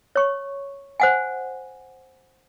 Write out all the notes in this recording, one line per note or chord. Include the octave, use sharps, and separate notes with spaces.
C#5 C#6
C5 F#5 G#5